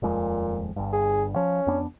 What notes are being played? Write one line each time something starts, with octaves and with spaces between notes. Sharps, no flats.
D#1 F2 A#2 G#3
G1 G2
G#4
F3 C#4
F2 B3 D4